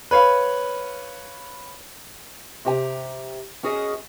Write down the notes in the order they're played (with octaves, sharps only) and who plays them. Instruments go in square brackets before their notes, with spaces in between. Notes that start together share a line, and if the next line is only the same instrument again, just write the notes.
[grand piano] B4 C#5 F5 B5
[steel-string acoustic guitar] C3 G4 G#5 A#5
C#4 F#4 G#4 A#4 D#5